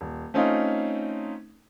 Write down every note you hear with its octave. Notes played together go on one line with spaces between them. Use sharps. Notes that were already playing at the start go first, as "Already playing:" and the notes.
D#1
A3 C4 C#4 D#4 F4